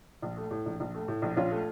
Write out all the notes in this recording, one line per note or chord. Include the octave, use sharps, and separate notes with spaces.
A#1
A3
A2
A#1
A#1
A3
A2
A#1
A#1 C#4 F4
A3